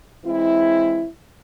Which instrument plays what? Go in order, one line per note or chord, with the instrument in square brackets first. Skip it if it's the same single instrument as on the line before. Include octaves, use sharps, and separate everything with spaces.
[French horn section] E3 G#3 C4 E4